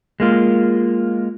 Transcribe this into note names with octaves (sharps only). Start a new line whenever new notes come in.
G#3 A#3 F4